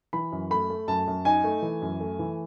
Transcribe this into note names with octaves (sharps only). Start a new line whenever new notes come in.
E3 B5
F#2
A3 B5
A3
F#2 A5
F#2
D#4 G#5
A3
E3
F#2
A3
E3